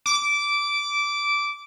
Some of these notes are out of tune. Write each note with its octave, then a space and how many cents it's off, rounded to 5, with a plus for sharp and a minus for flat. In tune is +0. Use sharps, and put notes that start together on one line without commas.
D6 -15